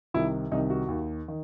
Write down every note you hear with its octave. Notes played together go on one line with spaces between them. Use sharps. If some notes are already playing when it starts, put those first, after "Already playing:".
C2 C3 D#3 E4
C2 C3 D#3 D#4
F#4
D#2 D#3
D#3